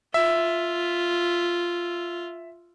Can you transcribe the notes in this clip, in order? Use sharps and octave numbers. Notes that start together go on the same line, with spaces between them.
F4 E5